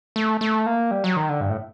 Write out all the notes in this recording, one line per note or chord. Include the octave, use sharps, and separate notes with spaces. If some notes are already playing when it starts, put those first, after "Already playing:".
A3
A3
A#3
G3
F#3
D#3
D3
G2
A2